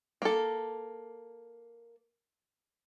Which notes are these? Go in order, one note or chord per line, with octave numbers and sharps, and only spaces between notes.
A#3 A4